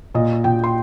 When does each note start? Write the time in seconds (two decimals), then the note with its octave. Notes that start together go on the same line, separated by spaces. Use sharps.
0.14 A#2 D#5
0.44 A#2 G5
0.64 C6